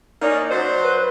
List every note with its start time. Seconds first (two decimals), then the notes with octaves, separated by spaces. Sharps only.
0.22 A#3 C#4 D#4 D5
0.50 F#3 C5
0.84 B4